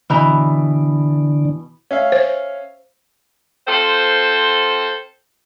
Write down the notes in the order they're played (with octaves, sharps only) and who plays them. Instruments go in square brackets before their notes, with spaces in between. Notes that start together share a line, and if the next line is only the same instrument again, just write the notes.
[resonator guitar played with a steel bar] B2 E3 A#5 [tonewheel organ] D3
[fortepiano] C#4 E5 F5
[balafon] C5
[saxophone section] C4 F4 A4 C5